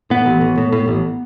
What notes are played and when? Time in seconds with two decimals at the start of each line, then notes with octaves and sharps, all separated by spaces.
0.10 A2 B3
0.26 A1
0.41 A1
0.58 A2
0.72 A2
0.88 A1